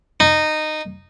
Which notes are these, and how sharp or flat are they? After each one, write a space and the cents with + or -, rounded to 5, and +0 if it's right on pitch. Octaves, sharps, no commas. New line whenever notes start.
D#4 -15